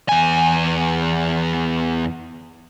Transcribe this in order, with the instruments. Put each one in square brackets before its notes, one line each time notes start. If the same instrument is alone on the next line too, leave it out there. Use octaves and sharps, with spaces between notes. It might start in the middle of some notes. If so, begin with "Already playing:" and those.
[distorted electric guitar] E2 G#5